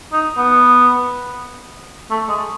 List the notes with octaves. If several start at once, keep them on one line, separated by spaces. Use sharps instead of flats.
D#4
B3
A3
G#3